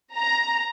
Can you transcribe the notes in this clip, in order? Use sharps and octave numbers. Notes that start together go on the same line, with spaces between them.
A#5